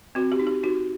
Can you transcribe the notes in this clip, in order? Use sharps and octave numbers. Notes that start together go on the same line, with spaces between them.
C4 F#4
G4
D#4
G4
D#4 F#4